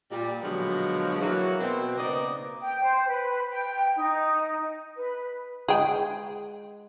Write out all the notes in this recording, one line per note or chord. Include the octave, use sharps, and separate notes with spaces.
A#2 G3
B2 D3 F3 F#3 G#3
E3 F#3 A#3
B2 C4
C#3 A#3 B3 D#4 D5 D#5
G5
C5
B4
G5
D#4
B4
G#3 G#4 G5